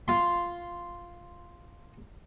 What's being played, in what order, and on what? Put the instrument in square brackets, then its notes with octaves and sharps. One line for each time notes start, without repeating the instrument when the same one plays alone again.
[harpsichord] F4 C6